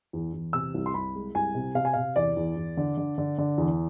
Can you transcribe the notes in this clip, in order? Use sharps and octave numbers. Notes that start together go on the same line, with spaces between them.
E2
E2
C3 E6
C2
C6
C2 B5
G#3
C2 G#5
C3
C3 F5
G#5
C3 F5
E2 D5
E2
E2
D3
D3
D3
D3
E2